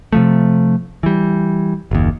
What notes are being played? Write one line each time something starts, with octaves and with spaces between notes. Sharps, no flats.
C3 F3 A3
E3 G3
F#1 D#2